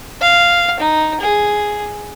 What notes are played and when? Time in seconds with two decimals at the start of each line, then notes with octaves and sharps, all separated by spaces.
0.21 F5
0.80 D#4
1.21 G#4